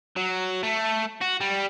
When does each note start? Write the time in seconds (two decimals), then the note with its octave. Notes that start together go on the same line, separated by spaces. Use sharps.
0.17 F#3
0.63 A3
1.21 F#4
1.40 G3